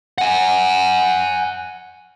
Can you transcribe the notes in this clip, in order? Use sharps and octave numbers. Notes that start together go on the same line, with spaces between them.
F#5 G#5